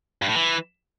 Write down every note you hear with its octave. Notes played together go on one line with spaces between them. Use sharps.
G2
A2
E3